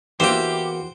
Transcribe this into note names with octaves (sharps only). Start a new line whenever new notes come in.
E2 E3 A#3 F#4 G4 C5 G5